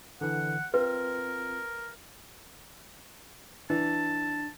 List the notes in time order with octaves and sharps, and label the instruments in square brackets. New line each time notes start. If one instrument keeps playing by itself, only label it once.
[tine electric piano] D3 E3 [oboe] F#5
[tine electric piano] C4 F4 [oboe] A#4 [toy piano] B4
[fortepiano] E3 [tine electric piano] D4 [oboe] A5